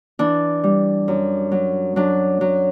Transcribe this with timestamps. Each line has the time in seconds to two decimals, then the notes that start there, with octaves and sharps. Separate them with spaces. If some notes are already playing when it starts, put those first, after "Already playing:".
0.19 E3 D4
0.64 G3
1.08 F#2
1.51 F#3
1.96 F#3 D4
2.41 F#3